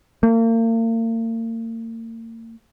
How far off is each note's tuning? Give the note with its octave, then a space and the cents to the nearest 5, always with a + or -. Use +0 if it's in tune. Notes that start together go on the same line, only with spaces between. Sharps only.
A#3 -40